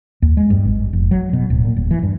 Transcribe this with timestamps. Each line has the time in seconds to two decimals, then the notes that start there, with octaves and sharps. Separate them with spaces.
0.22 D#2
0.37 G#3
0.50 G2
0.65 G#1
0.93 F1
1.11 F#3
1.33 B2
1.50 D1
1.65 A#2
1.77 D#1
1.91 E3
2.03 G2